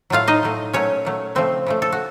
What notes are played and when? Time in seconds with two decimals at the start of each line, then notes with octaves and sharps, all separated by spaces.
0.10 A2 F#3 A3 F4 F5
0.28 D#4 D#5
0.43 A2 F#3 A3
0.73 A#2 F#3 A3 C#4 C#5
1.05 A#2 F#3 A3
1.35 C#3 F3 A3 C4 C5
1.66 C#3 F3 A3
1.82 A4
1.92 F#4